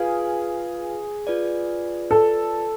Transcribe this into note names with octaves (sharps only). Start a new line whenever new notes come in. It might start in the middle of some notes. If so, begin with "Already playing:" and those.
Already playing: F4 G#4 B4 F5 G#5
F4 B4 D5
A4